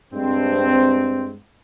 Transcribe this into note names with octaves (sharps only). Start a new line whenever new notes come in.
G2 G#3 C4